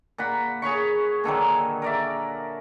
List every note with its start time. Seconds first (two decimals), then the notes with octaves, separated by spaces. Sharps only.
0.18 A#2 F#5 B5
0.62 G#4 C#5 B5 C#6
1.24 A#2 D3 D#3 F#3
1.82 A#4 D5 E5